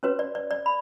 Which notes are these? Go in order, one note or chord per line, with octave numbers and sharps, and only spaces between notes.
C#4 F#4 B4 C#5
D5
D5
D5
B5